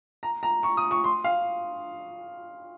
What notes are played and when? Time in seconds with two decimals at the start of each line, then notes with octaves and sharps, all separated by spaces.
0.23 A#5
0.43 A#5
0.63 C#6
0.77 D#6
0.91 C#6
1.04 C6
1.24 F5